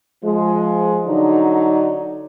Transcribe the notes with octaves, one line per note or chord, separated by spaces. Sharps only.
F3 G#3
D3 F#3 D4 D#4